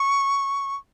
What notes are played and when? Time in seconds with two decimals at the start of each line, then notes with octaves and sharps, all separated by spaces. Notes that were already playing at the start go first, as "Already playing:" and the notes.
Already playing: C#6